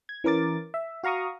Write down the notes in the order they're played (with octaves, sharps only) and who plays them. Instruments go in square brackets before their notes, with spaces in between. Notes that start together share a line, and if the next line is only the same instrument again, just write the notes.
[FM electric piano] G#6
E3 C#4 A#4 D6 A6
E5
F#4 F5 A#5 C#6 D#6